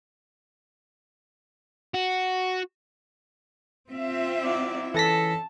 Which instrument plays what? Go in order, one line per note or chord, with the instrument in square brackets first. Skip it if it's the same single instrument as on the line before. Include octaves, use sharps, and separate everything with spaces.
[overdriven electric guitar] F#4
[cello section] C4 F4 E5
[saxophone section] F#3 D#4 E4 [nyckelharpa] D5
[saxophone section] C#3 C#4 A4 [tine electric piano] E3 A#6 B6 [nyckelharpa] A5